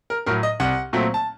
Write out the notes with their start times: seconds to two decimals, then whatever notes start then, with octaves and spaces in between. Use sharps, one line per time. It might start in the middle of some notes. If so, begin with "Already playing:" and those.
0.10 A#4
0.26 A2 F#3 A#4
0.43 D#5
0.60 C2 F#5
0.93 A#2 F#3 A3 C4
1.14 A5